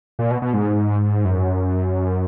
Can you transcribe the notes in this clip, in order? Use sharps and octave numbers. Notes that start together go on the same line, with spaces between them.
A#2
B2
B2
G#2
F#2